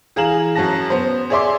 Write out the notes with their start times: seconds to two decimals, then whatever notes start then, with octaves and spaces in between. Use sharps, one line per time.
0.16 E3 G#4 F5 A#5 E7 F#7
0.55 F#2 C#4 F#4 A5 A#6
0.90 B3 C5
1.30 G#4 C#5 D5 E5 C6 D6